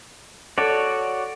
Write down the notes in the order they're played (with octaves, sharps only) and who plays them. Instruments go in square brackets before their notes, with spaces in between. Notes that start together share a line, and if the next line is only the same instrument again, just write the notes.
[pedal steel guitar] F#4 C#5 D5 [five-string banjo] A4